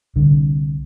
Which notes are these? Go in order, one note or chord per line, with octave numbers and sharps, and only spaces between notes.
C2 D3